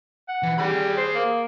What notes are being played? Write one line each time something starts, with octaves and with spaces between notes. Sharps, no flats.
F#5
E3
G3 G#4 B5
C5
A#3